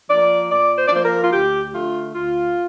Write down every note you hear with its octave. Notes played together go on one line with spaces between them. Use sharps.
F3 A#3 D5
A#2 D5
C5
D5
F3 A#3 C5
A#4
F4
D2 G4
D3 A3 F4
D2 F4